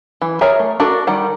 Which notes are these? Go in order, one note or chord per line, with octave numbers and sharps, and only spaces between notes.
E3
G#4 A#4 C#5 E5 A#5
A3
D4 F#4 A4 A#4
D#3 G3 F#5